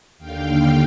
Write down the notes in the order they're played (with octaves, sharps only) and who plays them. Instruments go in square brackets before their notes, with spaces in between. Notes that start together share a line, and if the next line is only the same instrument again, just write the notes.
[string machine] D#2 D3 F5 G5